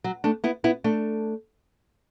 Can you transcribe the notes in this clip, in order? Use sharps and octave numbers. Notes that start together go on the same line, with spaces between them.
F#3
A3 D4
B3 E4
B3 E4
A3 D4